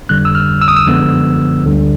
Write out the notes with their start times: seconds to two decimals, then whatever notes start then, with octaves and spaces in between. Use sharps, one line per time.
0.09 F2 D3 G3 F#6
0.25 E6
0.35 F6
0.61 E6
0.68 D#6
0.76 E6
0.87 F#2 D3 F3 G#3 B3
1.64 D2 D3 G3